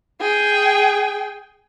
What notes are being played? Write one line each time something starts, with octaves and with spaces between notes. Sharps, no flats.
G#4 G5